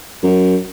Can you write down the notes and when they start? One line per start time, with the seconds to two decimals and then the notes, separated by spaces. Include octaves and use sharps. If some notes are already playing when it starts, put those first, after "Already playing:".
0.23 F#2